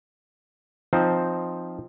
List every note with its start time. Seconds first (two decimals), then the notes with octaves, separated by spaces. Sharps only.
0.93 F3 C4 D#4 C5